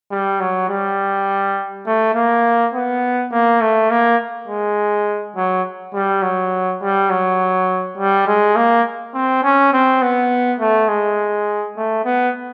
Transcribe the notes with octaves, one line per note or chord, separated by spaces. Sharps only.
G3
F#3
G3
A3
A#3
B3
A#3
A3
A#3
G#3
F#3
G3
F#3
G3
F#3
G3
G#3
A#3
C4
C#4
C4
B3
A3
G#3
A3
B3